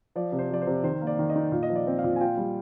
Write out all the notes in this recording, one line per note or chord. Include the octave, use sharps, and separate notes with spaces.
F3 D5
C3
C5
F3 D5
C5
C3
D#3 C5
A#3
D5
D#3
D#5
D#4
A#2
D#5
F3
D5
C4
F5
A#2
G#5
F4 G5
G3